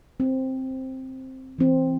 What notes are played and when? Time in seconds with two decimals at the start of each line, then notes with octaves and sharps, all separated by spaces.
0.20 C4
1.59 E3 C4